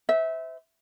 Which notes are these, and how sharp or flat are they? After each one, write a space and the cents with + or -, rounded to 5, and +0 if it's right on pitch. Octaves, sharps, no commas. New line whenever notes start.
C5 -35 E5 -20